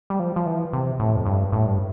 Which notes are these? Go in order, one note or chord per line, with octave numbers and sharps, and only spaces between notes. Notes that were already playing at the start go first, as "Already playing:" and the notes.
G3
F3
F3
E3
C3
A2
F2
G2
A2
G2